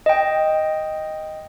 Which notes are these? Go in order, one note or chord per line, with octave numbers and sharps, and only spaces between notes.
D#5 G5